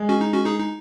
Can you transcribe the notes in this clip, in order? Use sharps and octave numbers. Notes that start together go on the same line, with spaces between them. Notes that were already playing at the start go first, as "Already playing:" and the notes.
Already playing: G#3
C#4 F#4
D#4
C#4 F#4
D#4 G#4
D#4